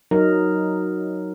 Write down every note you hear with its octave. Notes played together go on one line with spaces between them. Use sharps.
F#3 D#4 A#4